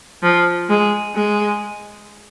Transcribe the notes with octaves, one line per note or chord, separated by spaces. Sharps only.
F3
G#3
G#3